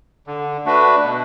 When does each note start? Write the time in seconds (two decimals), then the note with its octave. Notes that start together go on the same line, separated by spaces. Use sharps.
0.27 D3
0.65 A3 D4 F#4 B4
1.02 B2